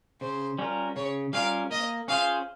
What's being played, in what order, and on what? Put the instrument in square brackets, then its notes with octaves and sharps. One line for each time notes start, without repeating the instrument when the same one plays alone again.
[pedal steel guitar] C#3 [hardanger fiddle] C5
[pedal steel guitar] G3 C#4 F4 A#4
[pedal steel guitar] C#3 [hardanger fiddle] C#5
[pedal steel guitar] G3 C#4 F4 A#4 [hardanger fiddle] F5
[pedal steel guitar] A#3 [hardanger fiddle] D#5
[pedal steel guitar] C#4 F4 G#4 C5 [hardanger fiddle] F5